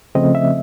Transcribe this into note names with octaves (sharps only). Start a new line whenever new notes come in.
C#3 F3 A3 C4 D#5
E5